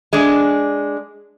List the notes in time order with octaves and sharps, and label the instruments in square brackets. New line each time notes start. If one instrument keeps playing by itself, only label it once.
[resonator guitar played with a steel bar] G#3 D4